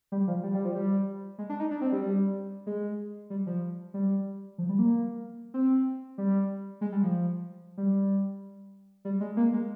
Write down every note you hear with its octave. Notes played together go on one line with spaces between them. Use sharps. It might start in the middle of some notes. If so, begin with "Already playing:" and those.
G3
F3
G3
G3
F3
G3
G#3
D4
D#4
D4
C4
G3
G3
G#3
G3
F3
G3
F3
G3
A#3
C4
G3
G#3
G3
F3
G3
G3
G#3
A#3
G#3